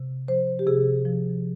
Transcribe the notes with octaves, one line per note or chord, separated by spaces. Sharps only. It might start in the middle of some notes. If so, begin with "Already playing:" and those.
Already playing: C3
F3 C5
G4
C3 G#4
F3